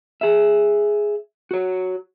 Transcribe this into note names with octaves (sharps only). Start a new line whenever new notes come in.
G#4 E5
F#4 C#5